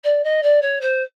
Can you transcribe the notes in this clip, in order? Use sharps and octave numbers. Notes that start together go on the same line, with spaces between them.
D5
D#5
D5
C#5
C5